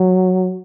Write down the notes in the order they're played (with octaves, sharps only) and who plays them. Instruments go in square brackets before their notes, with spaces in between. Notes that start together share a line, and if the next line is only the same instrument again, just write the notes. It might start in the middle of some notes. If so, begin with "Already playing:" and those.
Already playing: [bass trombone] F#3